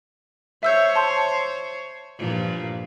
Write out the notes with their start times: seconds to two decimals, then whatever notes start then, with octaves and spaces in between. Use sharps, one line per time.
0.63 C5 C#5 E5 E6 G6
0.95 A5 C6
2.18 G2 A#2 F3